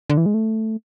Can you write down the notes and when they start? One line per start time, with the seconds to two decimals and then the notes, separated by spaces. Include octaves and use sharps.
0.10 D3
0.17 E3
0.26 G#3
0.34 A3